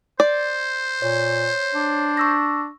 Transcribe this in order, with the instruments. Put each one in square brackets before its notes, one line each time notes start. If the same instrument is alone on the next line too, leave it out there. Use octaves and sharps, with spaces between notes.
[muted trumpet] C5 [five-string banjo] D5
[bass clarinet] A#2 [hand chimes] C#5
[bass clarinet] D4
[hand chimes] C#6 E6 A#6